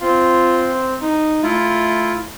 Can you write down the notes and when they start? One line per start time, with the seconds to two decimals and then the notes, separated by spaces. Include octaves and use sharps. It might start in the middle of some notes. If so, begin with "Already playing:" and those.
0.01 C4 F4
1.02 D#4
1.43 A3 E4 F4